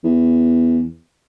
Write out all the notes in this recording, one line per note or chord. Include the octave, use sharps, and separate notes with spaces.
E2